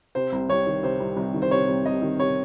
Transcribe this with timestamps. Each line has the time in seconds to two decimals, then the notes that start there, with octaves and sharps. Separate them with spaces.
0.15 C3 C5
0.33 C2
0.49 C2 C#5
0.67 D#3
0.83 C3 C5
1.00 C2
1.17 C2
1.34 D#3
1.42 C5
1.51 C3 C#5
1.69 C2
1.86 C2 D#5
2.02 D#3
2.19 C3 C#5